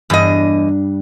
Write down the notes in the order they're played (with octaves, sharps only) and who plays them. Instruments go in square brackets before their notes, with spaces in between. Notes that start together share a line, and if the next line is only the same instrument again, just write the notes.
[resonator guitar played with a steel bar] E2 D#5 [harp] G2 G3 D4